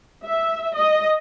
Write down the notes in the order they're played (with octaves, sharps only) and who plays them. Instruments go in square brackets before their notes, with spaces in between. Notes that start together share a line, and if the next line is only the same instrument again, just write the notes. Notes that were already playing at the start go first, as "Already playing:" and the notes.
[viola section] E5
D#5